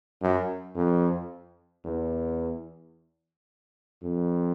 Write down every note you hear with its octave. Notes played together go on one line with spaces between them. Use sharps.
F#2
F2
E2
F2